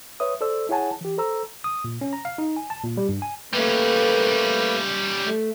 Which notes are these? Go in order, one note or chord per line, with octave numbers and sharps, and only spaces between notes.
B4 C#5 E5 D#6
A4 C5 D5 E6
E4 G#4 C#5 F#5 G#5 A5
E3 G4
A4 C5 A#5 E6
D#6
A#2
C#4
A#5
F5
D#4
G#5
A5
A#2
G3
G2
G#5
G3 A3 A#3 C#4 B4
A3